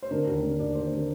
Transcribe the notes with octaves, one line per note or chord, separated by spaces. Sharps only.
C5
D3 A#4
D#2
D3
D#2 D5
D#2 C5
D3 A#4